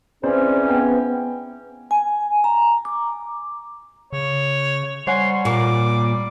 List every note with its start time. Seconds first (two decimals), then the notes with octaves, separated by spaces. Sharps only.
0.23 G#2 E3 C4 C#4 C5 D5
0.69 B3 G5
1.91 G#5
2.44 A#5
2.85 D6
4.13 C#3 C#5
5.07 G3 C#5 F#5 G#5 C6
5.45 A#2 A#3 D6